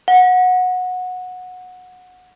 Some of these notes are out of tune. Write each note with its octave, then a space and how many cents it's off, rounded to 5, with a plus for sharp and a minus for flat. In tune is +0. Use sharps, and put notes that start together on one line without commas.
F#5 -20